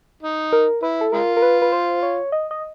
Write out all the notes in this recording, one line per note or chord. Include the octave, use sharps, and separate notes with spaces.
D#4
A#4
E4 B4
A4
G#3 F4 A#4
A#4
B4
B4
C5
C#5
D#5
D#5